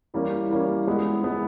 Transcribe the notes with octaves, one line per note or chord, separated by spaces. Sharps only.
E3 G3 A#3 C#4
E3 G3 A#3 C#4
G#3 B3 E4
G#3 B3 E4